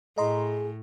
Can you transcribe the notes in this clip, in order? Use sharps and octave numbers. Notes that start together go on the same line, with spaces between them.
A2 G#4 D#5 A#5 C6